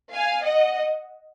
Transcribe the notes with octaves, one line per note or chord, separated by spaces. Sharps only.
F5 G#5
D#5 F#5